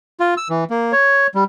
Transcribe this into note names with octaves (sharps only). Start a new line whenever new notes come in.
F4
E6
E3
A#3
C#5
G3